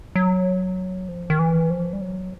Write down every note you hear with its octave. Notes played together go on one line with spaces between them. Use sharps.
F#3
F3
D#3
E3
F3
G3
F#3